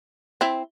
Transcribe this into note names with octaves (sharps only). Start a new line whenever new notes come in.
C4 E4